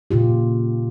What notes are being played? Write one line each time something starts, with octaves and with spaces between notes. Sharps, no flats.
A#2 C#3 F4 G4